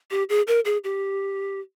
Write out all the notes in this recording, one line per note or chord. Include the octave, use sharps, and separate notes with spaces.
G4
G#4
A#4
G#4
G4